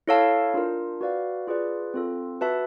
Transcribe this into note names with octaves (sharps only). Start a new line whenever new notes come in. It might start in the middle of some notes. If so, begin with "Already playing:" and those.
E4 A4 C#5 F5 A5
D4 F4 A#4
F#4 B4 D5 F5
F4 G#4 B4 D5
C4 F4 A4
F#4 B4 E5 A5